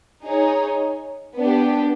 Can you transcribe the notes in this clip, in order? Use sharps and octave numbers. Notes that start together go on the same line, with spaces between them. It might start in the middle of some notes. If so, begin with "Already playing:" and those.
D#4 G#4 C#5
B3 D4 G4